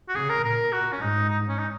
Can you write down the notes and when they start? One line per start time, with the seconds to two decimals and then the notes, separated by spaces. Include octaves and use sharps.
0.09 F#4
0.15 C#3 G#4
0.29 A#4
0.44 A#2 A#4
0.72 F#4
0.92 C#4
1.01 G#2 D#4
1.29 D#4
1.49 C#4
1.58 D#4